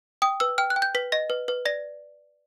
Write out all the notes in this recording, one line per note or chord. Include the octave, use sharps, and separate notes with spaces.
G5 D#6
B4 E6
G5 F6
F#6
G5
G6
B4 B6
D#5 A#6
B4
B4
D5 A#6